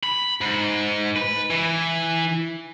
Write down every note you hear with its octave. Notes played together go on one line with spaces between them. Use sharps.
B5
G#2
B4
E3